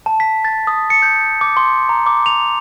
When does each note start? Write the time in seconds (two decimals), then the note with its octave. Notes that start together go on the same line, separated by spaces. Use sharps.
0.06 A5
0.20 B6
0.45 A6
0.67 D#6
0.90 C#7
1.02 G6
1.41 D6
1.57 C6
1.89 A#5
2.06 D6
2.26 F7